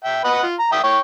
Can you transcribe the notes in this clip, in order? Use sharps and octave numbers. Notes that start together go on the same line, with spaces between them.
E5 G5
B4 D#5 F#5
F4
A#5
E5 G5 D#6
C#5 G5 C#6